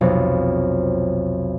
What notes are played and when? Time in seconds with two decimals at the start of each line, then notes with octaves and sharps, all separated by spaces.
0.01 B1 F2 C3